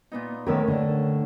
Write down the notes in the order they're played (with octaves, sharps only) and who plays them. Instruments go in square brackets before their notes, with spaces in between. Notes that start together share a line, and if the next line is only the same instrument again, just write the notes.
[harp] A#2 B3 D#4
[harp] A2 C#4 E6 [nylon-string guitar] D#3 B3 A#4
[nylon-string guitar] D3 D4